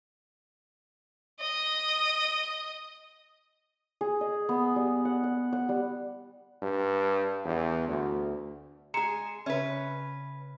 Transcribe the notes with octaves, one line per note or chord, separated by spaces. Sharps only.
D#5
G#4
D#5
B3
G3
F#5
F#5
F#5
G3
G2
E2
D2
G#3 G#4 A#5 C#7 E7
C#3 C#4 B4 E5